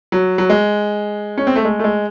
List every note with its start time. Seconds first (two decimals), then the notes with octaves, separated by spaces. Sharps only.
0.12 F#3
0.38 F#3
0.50 G#3
1.38 C#4
1.47 C4
1.56 A3
1.65 G#3
1.79 A3
1.84 G#3